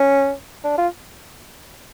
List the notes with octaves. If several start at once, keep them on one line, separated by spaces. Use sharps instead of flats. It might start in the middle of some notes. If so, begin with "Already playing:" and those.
Already playing: C#4
D4
F4